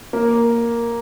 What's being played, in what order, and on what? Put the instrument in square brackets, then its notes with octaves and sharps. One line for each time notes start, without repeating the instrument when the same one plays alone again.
[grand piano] A#3